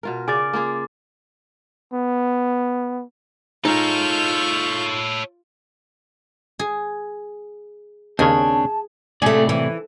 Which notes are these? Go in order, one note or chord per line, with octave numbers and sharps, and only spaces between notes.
B2 F4 A#4
C#3 D5 F5 G#5 D6 A6
A#3 F4 G#4
B3
G#3 D#4 F4 A4 C#5 F6 G6
G#4
D#2 C#3 C4 D4 G#4 C#5 A5
A2 C3 A3 G#4 D5
E3